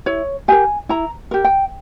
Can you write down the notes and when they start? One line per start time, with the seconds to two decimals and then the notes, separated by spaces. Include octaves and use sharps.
0.06 E4 C#5
0.48 G4 A#4 G#5
0.89 E4 A#5
1.31 G4 A#4
1.44 G5